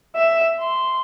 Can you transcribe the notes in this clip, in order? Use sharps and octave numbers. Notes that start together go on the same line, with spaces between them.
E5
C6